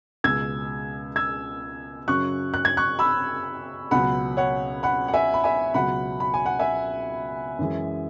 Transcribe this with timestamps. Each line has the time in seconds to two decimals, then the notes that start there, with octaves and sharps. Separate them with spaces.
0.24 C#2 B2 G#3 E6 G#6
1.16 E6 G#6
2.08 F#2 C#3 F#3 C#6 F#6
2.54 F#6
2.65 G#6
2.77 C#6 F#6
2.99 B5 E6
3.91 C#2 B2 F#3 F#5 B5
4.37 C#5 F#5
4.83 F#5 B5
5.08 F#5
5.13 E5 G#5
5.34 B5
5.44 E5 G#5
5.74 C#2 B2 F#3 F#5 B5
6.20 B5
6.34 G#5
6.46 F#5
6.59 E5 G#5
7.59 F#2 E3 G#3